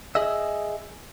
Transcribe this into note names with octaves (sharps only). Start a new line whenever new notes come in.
G#4 D#5 E5